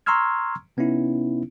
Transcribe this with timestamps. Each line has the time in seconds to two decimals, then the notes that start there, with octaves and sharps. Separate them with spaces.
0.06 A#5 C6 C#6 E6 F6 G#6
0.77 C3 B3 C#4 D#4 E4